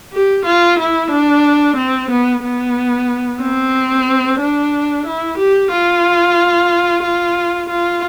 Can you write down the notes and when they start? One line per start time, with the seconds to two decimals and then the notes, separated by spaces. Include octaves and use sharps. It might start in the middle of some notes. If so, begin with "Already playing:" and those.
0.13 G4
0.45 F4
0.79 E4
1.11 D4
1.77 C4
2.10 B3
2.43 B3
3.41 C4
4.40 D4
5.06 E4
5.38 G4
5.72 F4
7.03 F4
7.69 F4